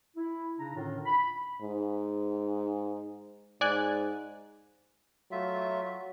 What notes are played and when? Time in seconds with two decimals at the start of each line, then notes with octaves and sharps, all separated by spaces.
0.16 E4
0.59 C#3 D4 D#4 A#5
0.76 A2 D3 D#3 C#4 D4 F4
1.05 B5
1.62 G#2
3.61 G#2 D5 G#5 F#6
5.32 F#3 A3 F4 E5